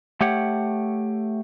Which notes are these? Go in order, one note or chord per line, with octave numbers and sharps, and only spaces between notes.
A3 G4 C#5 F#5